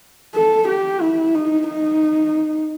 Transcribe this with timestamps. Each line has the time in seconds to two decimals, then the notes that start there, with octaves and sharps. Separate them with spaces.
0.35 A4
0.68 G4
1.01 E4
1.35 D#4
1.68 D#4